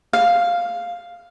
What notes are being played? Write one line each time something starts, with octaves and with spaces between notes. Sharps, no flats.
F5